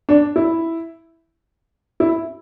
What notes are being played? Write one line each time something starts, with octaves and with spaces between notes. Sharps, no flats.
D4
E4
E4